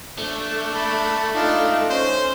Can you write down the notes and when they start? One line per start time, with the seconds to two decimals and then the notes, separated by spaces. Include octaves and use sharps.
0.18 A3 D4
0.75 A5 B5
1.35 D4 D#4 F4
1.90 C#4 C5